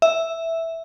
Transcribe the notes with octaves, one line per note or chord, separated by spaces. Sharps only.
E5